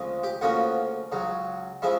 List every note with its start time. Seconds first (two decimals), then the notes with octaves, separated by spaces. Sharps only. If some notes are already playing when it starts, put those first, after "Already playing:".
Already playing: D2 C#3 F3 G#3 C4
0.23 G4 G5
0.41 D2 C#3 F3 A#3 C#4 F#4 F#5
1.12 C#2 C#3 F#3
1.82 C#3 F3 G#3 E4 E5